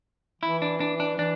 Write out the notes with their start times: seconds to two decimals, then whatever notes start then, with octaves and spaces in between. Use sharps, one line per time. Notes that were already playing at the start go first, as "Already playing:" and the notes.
0.42 E3 E4
0.62 D4
0.80 D4
1.00 D4
1.19 E3 D4